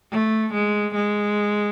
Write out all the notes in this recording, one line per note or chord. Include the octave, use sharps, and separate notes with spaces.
A3
G#3
G#3